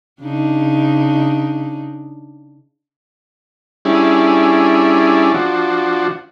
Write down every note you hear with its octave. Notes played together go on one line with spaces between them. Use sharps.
C#3 D4 D#4
G3 C#4 D4 E4 G#4
F3 D4 F#4